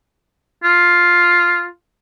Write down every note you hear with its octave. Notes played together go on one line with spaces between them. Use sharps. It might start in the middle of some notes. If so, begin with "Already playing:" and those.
F4